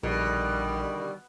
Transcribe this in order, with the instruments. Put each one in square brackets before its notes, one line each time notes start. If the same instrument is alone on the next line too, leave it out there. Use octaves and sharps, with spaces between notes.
[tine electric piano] A#1 [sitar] B2 [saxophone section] D3 D#3 G3